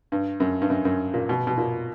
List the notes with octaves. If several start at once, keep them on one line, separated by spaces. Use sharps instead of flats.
G2
F#2
G2
F#2
F#2
A#2
B2
B2
A#2